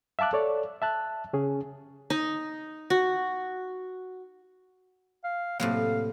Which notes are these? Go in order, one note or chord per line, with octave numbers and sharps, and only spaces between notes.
E5 F5 A5 D6 F#6
A4 C#5 D5
E5 A5 F#6
C#3 C#4 G#4
D#4
F#4
F5
A2 C3 F#3 A#3 F5